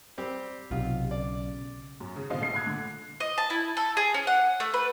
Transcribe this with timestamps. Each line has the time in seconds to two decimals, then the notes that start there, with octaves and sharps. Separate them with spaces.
0.18 G3 C4 G4
0.71 B1 C3 F4
1.11 C#3 D5
2.00 F#2
2.16 C#3
2.30 A1 B2 D3 C4 D#5 F5
2.42 A#1 C7
2.54 A#2 B5 F#6 G#6
2.66 D3 A3
3.20 D#5
3.38 A5
3.50 E4
3.77 A4
3.97 G#4
4.14 C#4
4.27 F#5
4.60 A3
4.74 B4